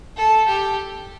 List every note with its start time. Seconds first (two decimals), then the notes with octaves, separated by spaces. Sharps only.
0.17 A4
0.47 G4